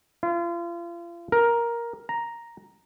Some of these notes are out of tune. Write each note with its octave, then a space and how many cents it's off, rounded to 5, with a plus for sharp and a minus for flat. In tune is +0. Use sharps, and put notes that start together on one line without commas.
F4 -35
A#4 +10
A#5 +0